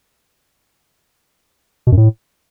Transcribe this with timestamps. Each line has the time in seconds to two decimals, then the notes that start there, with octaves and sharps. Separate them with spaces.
1.87 B2
1.92 F#2
1.97 A2